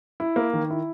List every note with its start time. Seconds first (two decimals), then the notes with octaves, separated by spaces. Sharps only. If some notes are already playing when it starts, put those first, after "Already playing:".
0.20 E4
0.36 A#3
0.53 D#3
0.70 E4